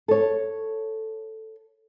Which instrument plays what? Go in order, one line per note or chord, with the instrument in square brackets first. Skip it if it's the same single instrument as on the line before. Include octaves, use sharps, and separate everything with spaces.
[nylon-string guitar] A4 C#5